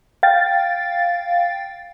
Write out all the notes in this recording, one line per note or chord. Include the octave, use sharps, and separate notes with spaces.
F5 G5 A6